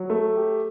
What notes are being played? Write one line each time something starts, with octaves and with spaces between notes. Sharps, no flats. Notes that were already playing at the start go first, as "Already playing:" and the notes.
Already playing: F#3
A3
G4